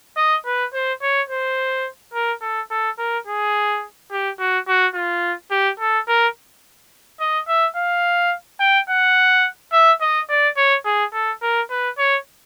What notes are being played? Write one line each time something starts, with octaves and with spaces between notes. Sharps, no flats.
D#5
B4
C5
C#5
C5
A#4
A4
A4
A#4
G#4
G4
F#4
F#4
F4
G4
A4
A#4
D#5
E5
F5
G5
F#5
E5
D#5
D5
C#5
G#4
A4
A#4
B4
C#5